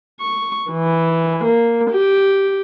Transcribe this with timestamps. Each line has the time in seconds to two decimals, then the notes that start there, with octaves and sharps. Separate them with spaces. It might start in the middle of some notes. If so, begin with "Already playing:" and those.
0.21 C#6
0.71 E3
1.44 A#3
1.91 G4